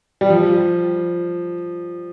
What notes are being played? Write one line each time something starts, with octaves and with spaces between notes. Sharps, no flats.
G3
F3